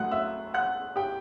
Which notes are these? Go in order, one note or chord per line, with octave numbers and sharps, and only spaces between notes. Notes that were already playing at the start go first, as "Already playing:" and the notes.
Already playing: A2 F#3 A3 F#5 F#6
E5 E6
F#5 F#6
G4 G5